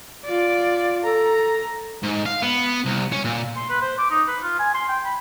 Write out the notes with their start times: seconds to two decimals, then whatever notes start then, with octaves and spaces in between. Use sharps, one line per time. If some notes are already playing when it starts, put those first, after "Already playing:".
0.25 F4 D5
1.04 A4 A#5
2.03 G#2
2.26 F5
2.43 B3
2.84 C2
3.12 C#4
3.25 A#2
3.56 C6
3.69 B4
3.82 C5
3.98 D6
4.10 D#4
4.28 B4
4.43 F4
4.59 G#5
4.74 C6
4.88 G5
5.05 B5